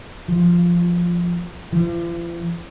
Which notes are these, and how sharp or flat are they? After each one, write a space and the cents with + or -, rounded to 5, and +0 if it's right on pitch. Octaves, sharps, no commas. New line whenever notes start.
F3 -5
F3 -45